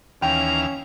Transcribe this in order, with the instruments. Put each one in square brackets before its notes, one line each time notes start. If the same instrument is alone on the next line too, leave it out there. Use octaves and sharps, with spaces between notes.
[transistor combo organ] D#2 E3 F5 [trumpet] C#4 [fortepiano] G5 [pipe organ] A#5